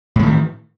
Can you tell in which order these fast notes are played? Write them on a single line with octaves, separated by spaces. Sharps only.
A2 G#3 D#3 E3